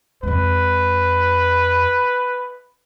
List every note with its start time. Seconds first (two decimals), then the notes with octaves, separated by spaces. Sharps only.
0.23 F2 G#3 B4